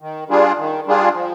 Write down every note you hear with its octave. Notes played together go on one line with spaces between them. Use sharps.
D#3
G3 D4 F4 G#4
D#3
G3 D4 F4 G#4
F3